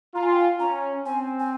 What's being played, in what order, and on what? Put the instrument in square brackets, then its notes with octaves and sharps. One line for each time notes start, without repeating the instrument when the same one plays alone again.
[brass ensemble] F4 [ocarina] A#5
[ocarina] G#5
G5
G#5
[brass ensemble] C#4 [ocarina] A#5
[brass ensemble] C4 [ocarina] G#5
[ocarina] G#5